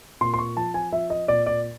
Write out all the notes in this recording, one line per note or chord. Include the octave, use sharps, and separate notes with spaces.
A#2 C6
C6
C#6
F3 A5
G#5
F3 E5
D#5
A#2 D5
D5